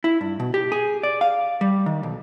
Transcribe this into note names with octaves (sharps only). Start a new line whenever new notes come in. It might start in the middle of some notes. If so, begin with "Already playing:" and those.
E4
G2
B2
G4
G#4
D5
F5
G3
D#3
B1